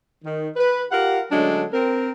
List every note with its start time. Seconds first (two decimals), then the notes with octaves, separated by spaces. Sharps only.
0.24 D#3
0.56 B4
0.92 F4 G4 A#4 F5 F#5
1.32 D3 F#3 G#3 A3 C#4 D4
1.73 C4 A#4